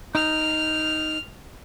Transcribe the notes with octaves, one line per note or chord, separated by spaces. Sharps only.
D#4 F6